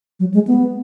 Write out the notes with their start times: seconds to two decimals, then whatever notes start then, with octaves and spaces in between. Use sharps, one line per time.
0.20 F#3
0.34 G#3
0.47 B3